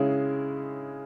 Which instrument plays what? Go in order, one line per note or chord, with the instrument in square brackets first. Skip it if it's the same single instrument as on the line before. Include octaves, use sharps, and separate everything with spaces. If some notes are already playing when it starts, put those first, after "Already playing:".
Already playing: [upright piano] C#3 G#3 C#4 E4 G#4